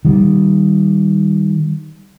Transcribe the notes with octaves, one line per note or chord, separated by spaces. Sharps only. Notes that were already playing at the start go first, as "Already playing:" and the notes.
D#3 G3